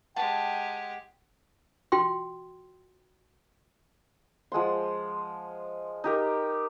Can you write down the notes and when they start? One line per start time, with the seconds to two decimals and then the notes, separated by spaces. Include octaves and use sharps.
0.16 G#3 G4 F#5 G5 A5 D6
1.92 F4 F#4 G5 C6
4.52 F3 G#3 F#5 C6
6.04 D#4 G4 A#4